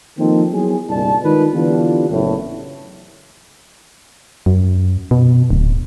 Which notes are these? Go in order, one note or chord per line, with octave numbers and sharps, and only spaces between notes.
D#3 F3 A#3 C4 D#4 A4
F#3 B3 E4 G#4
C2 G2 A#2 D#3 D5 A5
D#3 G#3 F4 B4
D3 E3 B3 D4 F4 G4
F#1 A2
F#2
B2
D1